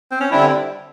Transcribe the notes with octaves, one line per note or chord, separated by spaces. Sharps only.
C4
C#4
D3 G3 C4 D4 E4